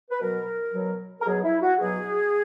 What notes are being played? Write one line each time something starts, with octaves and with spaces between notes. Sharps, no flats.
B4
B2 F#3 A#4
B2 F#3
A#4
B2 F#3 G#4
E4
F#4
B2 F#3 G#4